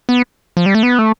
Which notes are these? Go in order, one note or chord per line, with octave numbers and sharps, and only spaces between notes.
B3
F3
G3
A3
B3
A3